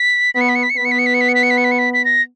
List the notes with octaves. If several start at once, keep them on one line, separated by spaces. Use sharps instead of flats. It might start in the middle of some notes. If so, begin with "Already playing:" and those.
Already playing: B6
B3 B6
C#7
B6
C#7
B6
C#7
B3 B6
C#7
B6
C#7
B6
C#7
B6
C#7
B6
C#7
B6
C#7
B6
C#7
B6
B6
A#6